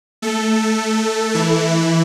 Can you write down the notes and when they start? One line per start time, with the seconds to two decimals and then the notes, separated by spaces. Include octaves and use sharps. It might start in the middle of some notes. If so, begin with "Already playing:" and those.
0.22 A3 A4
1.34 E3 E4